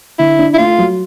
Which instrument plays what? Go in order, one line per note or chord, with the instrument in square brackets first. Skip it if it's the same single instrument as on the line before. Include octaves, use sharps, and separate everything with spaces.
[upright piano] D3 [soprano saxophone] E4
[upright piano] D4
[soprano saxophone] E4
[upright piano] A3 [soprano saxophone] F4
[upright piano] F#3